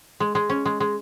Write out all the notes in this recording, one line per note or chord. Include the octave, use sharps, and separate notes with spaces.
G#3
G#3
C#4
G#3
G#3